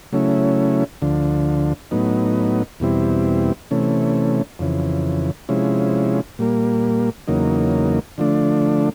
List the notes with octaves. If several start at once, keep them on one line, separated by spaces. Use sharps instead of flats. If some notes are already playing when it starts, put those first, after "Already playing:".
C#3 F#3 A3 C#4 E4
D2 D3 F3
A2 F#3 B3 D#4
E2 B2 G3 C4 E4
C3 E3 A3 C#4
F2 C#3 E3
C3 F3 G#3 C#4 E4
A#2 G3 A#3
E2 C#3 F#3 A#3 D#4
D3 F3 A3 D4